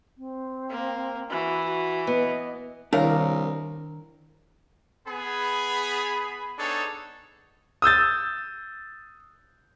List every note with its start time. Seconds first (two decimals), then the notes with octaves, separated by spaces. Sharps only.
0.18 C4
0.70 A#3
1.30 E3 F#4
1.66 F#4
2.07 B3 D#5
2.93 C2 D#3 D4 E4 A#4 C#5 F5
5.08 B3 G#4 B5
6.57 B3 D4 D#4 G#4 A4 C#5
7.82 D#6 E6 G6 A6